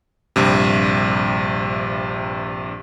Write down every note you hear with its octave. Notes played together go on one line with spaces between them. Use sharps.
A#1 G2 C3